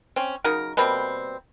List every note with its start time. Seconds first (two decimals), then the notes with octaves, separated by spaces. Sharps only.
0.16 C4 C#4
0.44 C#3 F#3 D#4 A#4
0.77 B2 G3 A#3 C4